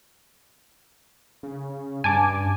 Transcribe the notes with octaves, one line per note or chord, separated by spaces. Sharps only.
C#3
G2 G#5 A5 D6